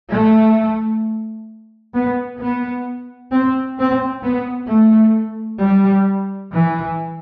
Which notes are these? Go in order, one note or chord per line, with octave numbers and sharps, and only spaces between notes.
A3
B3
B3
C4
C4
B3
A3
G3
E3